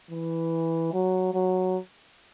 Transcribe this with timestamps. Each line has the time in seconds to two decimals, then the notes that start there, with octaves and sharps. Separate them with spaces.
0.11 E3
0.93 F#3
1.34 F#3